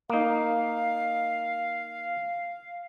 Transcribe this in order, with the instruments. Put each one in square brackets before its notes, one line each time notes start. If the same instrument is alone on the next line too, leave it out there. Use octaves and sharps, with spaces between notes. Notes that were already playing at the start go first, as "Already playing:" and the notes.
[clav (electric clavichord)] A#3 D#4 [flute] F5